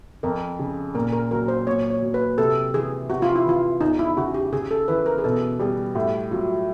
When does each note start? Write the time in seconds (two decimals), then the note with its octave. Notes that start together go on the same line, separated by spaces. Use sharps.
0.23 F2 A#4
0.59 C#3
0.95 A#2 A#4
1.12 A#4
1.31 F#3 A#4
1.48 C5
1.66 A#2 C#5
1.90 C#5
2.02 F#3
2.14 B4
2.38 C3 A4
2.73 E3 G#4
3.09 C3 F#4
3.22 F4
3.35 E4
3.45 E3 F4
3.81 E2 D#4
3.99 E4
4.17 C#3 F#4
4.34 G4
4.52 C#3 G#4
4.71 A4
4.88 E3 B4
5.06 A#4
5.18 G#4
5.24 B2 A4
5.59 G3 G#4
5.95 A2 F#4
6.31 F#3 F4